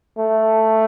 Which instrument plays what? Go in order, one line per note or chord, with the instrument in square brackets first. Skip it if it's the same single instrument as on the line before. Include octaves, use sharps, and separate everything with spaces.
[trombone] A3